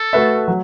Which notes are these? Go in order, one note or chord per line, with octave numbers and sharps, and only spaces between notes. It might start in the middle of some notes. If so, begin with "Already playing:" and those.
Already playing: A4
A3 F#4 B4 E5
F#3